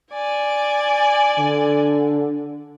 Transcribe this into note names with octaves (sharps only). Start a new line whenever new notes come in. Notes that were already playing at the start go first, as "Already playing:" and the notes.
D5 G#5
D3